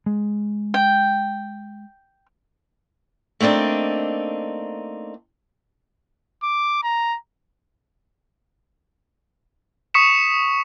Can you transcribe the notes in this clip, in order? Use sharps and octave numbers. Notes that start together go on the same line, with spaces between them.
G#3
G5
A3 A#3 C4 D4 D#4
D6
A#5
C#6 D#6 B6 C#7 E7